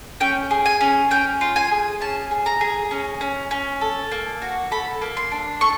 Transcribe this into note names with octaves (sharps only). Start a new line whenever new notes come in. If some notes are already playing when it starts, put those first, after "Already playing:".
C#4 G5
G#4
G#5
C#4
C#4 G5
F4
G#5
G#4
C#4 A5
G#4
A#5
G#4
C#4
C#4
C#4
A4
A#3
F#4
A4 B5
A#3
C6
D4
A4 C#6